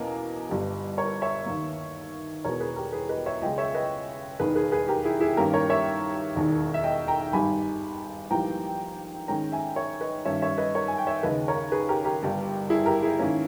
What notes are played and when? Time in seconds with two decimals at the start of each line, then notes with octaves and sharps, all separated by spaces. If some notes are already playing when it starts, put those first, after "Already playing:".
Already playing: E2 B2 A#3 C#4 A#4 D#5
0.49 G1 G2 G3
0.98 A#4 C#5
1.22 C#5 E5
1.46 D#2 D#3 A#3
2.44 E1 E2 B2 A#4 C#5
2.60 G#4 B4
2.76 G4 A#4
2.93 G#4 B4
3.09 B4 D#5
3.26 C#5 E5
3.42 C#2 C#3 G#3 D#5 G5
3.58 C#5 E5
3.74 B4 D#5
4.40 E1 D#2 D#3 G#4 B4
4.56 G#4 B4
4.72 G#4 B4
4.88 G4 A#4
5.04 E4 G#4
5.20 E4 G#4
5.37 G2 D#3 A#3 C#4 G4 A#4
5.54 A#4 C#5
5.70 C#5 E5
6.35 E1 D#2 D#3
6.74 E5
6.84 D#5 G5
7.08 G5 A#5
7.33 G#1 G2 G3 G#5 B5
8.30 A#1 G#2 E3 G3 A#3 G5 A#5
9.28 G#2 D#3 G#3 C#4 G5 A#5
9.52 E5 G#5
9.76 C#5 E5
10.01 B4 D#5
10.25 G2 D#3 G3 C#4 C#5 E5
10.42 C#5 E5
10.58 B4 D#5
10.75 A#4 C#5
10.88 G#5
10.98 G5
11.07 C#5 E5
11.23 D#2 C#3 G#3 B4 D#5
11.48 A#4 C#5
11.72 G#4 B4
11.89 G4 A#4
12.04 G4 A#4
12.21 G1 G2 G3
12.70 E4 G#4
12.86 G4 A#4
13.03 E4 G#4
13.19 G#2 D#3 A#3 C#4